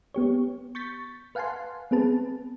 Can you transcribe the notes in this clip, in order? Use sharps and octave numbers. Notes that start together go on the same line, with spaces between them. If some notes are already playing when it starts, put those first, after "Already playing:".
B3 G4 C#5
C#6 G6 A6 B6
B4 F5 F#5 G#5 A5 C6
B3 C4 G#4 B4 A5